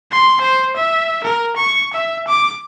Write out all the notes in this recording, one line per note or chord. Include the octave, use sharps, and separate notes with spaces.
C6
C5
E5
A#4
C#6
E5
D6